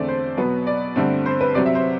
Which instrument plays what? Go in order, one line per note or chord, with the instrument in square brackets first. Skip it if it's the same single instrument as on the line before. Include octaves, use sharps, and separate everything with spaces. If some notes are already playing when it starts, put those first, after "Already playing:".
Already playing: [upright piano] E2 D3 A3 C4 D5
C5
B2 F#3 B3
D5
G2 D3 A3 C4
C5
B4
C3 F#3 C4 D5
E5
C5